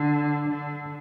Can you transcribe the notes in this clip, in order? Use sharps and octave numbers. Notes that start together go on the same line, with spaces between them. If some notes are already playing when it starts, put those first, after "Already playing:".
Already playing: D3
D3